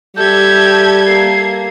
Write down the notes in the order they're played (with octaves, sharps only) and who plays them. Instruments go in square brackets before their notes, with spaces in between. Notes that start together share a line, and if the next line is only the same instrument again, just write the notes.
[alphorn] G3 [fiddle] G4 E5 [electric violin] A4 G#6 [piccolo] G6
[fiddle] A#3 [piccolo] C7